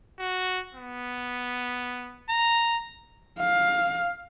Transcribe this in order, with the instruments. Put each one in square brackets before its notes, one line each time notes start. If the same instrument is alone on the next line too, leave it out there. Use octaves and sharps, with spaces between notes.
[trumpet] F#4
B3
A#5
[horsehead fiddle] F5